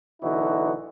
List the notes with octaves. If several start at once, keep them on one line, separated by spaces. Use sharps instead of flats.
B1 D3 E3 D#4 E4 F#4